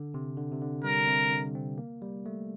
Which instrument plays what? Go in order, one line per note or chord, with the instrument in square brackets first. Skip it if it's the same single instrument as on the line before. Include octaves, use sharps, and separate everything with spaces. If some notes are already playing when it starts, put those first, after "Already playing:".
Already playing: [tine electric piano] D3
C3
D3
C3
D3
[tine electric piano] G3 [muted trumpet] A#4
[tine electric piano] C3
D3
C4
A#3
G3
A3